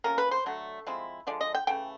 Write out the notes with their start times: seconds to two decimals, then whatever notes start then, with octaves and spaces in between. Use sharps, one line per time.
0.04 C3 F3 A#3 C#4 A#4
0.18 B4
0.31 C5
0.46 D3 F#3 A3
0.87 F3 G#3 C4 E4
1.27 D3 F3 G#3 D5
1.41 D#5
1.55 G5
1.67 C#3 E3 A3 G5